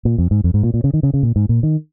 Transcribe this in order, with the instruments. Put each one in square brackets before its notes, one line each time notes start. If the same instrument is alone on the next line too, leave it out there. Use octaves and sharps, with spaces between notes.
[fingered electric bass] A#2
F2
G#2
F2
G#2
A#2
A#2
C#3
D#3
C#3
C#3
A#2
G#2
A#2
D#3